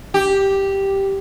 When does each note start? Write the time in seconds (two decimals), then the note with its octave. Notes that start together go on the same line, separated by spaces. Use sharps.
0.14 G4